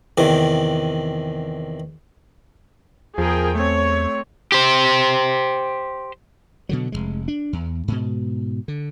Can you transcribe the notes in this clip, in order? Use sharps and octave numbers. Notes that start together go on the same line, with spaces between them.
E2 C3 D#3
E2 F3 G#4 A#4 G5
A3 C4 C#5
G4 C5
B2 D3 F#3
F1 D#2 G#3
D4
E2
G#2 B2
D3